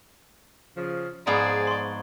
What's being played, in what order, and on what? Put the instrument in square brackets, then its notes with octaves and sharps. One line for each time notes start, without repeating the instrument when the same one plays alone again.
[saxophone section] C#3 F3
[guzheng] G#2 F3 B3 [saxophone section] G#4 [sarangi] D5 [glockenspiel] A#5 G#6
[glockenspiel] C6 C#6